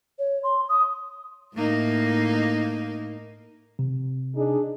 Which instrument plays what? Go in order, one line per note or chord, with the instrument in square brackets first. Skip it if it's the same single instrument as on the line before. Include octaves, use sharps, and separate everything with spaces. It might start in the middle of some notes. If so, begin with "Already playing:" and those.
[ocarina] C#5
C6
D#6
[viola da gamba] A2 A#3 D#4
[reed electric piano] C3
[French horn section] D4 D#4 G#4